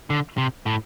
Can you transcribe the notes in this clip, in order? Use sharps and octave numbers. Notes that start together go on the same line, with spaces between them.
D3
C3
A2